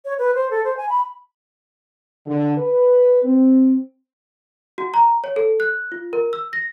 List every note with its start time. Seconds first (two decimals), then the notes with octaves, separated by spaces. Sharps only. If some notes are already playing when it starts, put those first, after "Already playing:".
0.05 C#5
0.18 B4
0.35 C5
0.51 A4
0.64 C5
0.77 G#5
0.89 B5
2.26 D3
2.57 B4
3.23 C4
4.78 F#4
4.94 A#5
5.24 C#5
5.36 A4
5.60 F#6
5.92 F4
6.13 A#4
6.33 E6
6.53 A#6